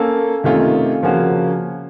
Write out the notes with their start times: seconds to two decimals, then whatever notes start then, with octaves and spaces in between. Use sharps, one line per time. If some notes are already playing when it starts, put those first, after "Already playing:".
Already playing: A#3 C#4 A4
0.44 C3 D#3 A3 C#4 F4
1.02 C#3 F3 A#3 C#4 F#4